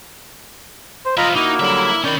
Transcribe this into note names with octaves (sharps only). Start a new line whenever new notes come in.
C5
F3 F4 D#5 E5 A#5 B5
A#3 D#4 E4 F#4
D3 F#3 G3 E4 E5
D#3 C#4 D5 B5 G6